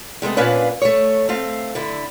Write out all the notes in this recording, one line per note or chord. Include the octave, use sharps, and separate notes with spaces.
C3 G#3 A3 B3
A#2 B3 C#4 D4 B4 F5
A3 C#5
A3 C4 F5
D3 E4